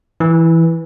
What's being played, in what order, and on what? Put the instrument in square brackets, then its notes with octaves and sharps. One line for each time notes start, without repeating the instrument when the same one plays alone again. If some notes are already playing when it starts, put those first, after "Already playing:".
[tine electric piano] E3